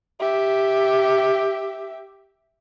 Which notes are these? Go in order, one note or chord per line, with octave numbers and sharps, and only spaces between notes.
G4 E5